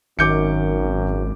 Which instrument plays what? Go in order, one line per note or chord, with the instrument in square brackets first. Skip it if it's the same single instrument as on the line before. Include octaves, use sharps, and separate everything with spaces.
[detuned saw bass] G#1 [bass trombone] F#2 [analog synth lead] D#3 [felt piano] D6 G6 C#7